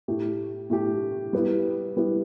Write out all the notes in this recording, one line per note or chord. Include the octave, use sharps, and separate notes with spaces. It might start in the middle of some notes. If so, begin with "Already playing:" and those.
A2 A3 G4
A2 A3 G4
G3 B3 E4
G3 B3 E4